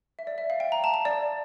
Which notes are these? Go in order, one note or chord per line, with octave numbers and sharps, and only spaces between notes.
E5
D5
E5
F5
G5
A#5
A5
A5
D5